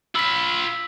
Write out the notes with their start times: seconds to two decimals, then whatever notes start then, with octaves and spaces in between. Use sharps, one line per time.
0.15 F4 B5 E6 B6